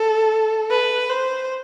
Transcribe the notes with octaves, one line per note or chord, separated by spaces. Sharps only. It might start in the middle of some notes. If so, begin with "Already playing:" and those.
Already playing: A4
B4
C5